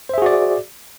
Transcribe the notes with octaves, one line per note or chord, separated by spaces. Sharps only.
F#4 G#4 C5 D5 E5